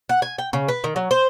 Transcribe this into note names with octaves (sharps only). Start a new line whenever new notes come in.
F#5
G#5
G5
C#3
B4
D#3
F#3
C5